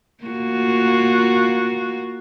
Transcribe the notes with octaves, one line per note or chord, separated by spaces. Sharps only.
A#3 F4 F#4